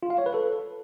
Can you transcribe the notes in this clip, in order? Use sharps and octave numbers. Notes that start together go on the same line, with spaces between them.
F4
F5
C#5
B4
A4